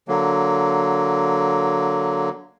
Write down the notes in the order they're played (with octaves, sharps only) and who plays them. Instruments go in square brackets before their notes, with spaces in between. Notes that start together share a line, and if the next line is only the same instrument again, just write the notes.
[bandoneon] D3 F#3 A#3